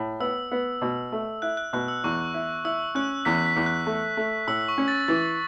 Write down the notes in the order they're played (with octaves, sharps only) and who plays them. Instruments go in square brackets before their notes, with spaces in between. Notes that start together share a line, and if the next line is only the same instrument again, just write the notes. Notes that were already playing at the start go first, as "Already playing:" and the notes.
Already playing: [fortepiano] A2
[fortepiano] B3 [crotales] E6
[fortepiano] B3
B2
A3
[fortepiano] E4 [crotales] F#6
[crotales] F#6
[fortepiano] B2 [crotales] F#6
[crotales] E6
[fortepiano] E2 [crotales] C#6
[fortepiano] E4
[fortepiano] E4 [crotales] E6
[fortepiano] C#4 [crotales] F#6
[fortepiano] E2 [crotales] B6
[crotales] B6
[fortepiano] E2
[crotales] F#6
[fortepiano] A3
A3
[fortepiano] A2 [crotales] E6
[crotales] C#6
[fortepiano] C#4
[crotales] A6
[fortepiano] E3 [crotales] A6